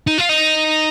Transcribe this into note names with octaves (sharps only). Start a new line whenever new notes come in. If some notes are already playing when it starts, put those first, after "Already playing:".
D#4
F4
D#4